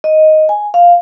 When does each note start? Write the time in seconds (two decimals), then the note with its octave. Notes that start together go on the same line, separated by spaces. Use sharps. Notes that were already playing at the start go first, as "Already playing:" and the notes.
0.04 D#5
0.49 G#5
0.74 F5